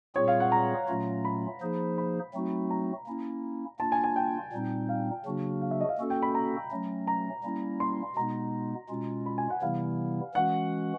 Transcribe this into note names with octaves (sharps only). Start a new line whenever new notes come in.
A#2 G3 C4 F4 G#4 C#5
F5
F#5
A#5
A#2 F#3 A3 C#4 F4
B5
F3 A#3 D#4 G#4 C5
B5
F#3 A3 C4 D#4 F#4
A#5
A#3 C#4 E4
A#3 D4 F4 A5
G#5
G#5
G5
A#2 G3 C4 D#4
F5
C#3 F#3 A#3 D4 F#4
F5
E5
D#5
F5
A#3 C#4 F#4 A4
G5
B5
A#5
F#3 A3 C#4
A#5
G3 A#3 C#4 E4
C6
B2 G#3 B3 D#4 A#5
B2 G#3 C#4 F4
B5
G#5
F#5
C3 E3 G3 B3 E4 F5
E3 G#3 C#4 F#4 F#5